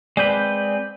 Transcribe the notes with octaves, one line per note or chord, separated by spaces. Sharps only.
G#3 C4 B4 D5 G6